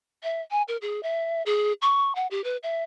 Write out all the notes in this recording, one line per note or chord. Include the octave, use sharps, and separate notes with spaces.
E5
G#5
A#4
G#4
E5
G#4
C#6
F#5
G4
B4
E5